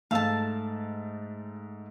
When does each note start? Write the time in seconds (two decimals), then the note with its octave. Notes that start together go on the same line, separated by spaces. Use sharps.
0.11 G#2 A3 F5 A5 E6